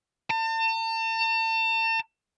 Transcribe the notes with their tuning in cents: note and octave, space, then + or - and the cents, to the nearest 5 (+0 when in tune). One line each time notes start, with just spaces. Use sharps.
A5 +40